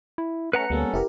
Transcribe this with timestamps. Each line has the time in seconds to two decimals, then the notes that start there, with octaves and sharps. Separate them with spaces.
0.18 E4
0.53 A3 C#4 B4 F#5 A#5 C#7
0.70 D2 G3 A#3 B3 C#4 A4
0.94 F1 E4 G4 A#4